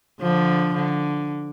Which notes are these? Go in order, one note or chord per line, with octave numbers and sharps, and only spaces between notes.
D3 F3
D3